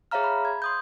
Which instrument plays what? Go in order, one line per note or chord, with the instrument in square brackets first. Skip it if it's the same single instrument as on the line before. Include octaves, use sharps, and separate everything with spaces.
[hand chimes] G#4 C#5 E5 F5 A#5 F6
B5
G#6
C6 D#6 G6